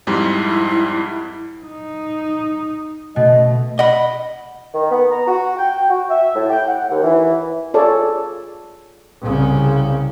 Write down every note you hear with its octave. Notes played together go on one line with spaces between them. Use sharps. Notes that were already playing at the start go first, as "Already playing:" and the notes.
F2 G#2 G3 E4
D#4
B2 A3 D#5
D#5 F#5 B5
D#3
B3
A#5
F#4
G5
F#4
E5
A2
G5
F#5
D#2
E3
F4 G#4 A4 C#5 D5 A5
C2 C#3